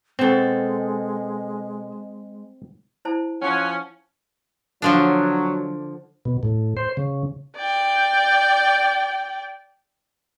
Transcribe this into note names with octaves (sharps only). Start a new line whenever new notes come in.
B2 G#3 C4 A4
E4 C5 A5
F3 C#4 F#5 G#5
D3 F3 F#3 D4
B2
A2
C5
C#3
D5 G5